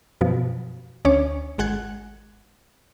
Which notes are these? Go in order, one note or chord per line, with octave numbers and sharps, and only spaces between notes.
F#2 B2 F3
D2 C#4 C#5 D6
G#1 G#3 F#5 F#6 G#6